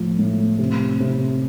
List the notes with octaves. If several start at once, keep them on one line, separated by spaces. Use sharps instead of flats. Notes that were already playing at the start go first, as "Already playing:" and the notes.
Already playing: A2 F3
A2
C3
C3